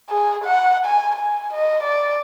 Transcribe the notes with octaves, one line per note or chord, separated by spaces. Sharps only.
G#4
F#5
G#5
G#5
D#5
D5